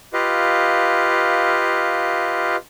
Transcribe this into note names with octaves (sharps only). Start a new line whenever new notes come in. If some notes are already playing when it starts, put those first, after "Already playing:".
F4 G4 B4 D#5 F5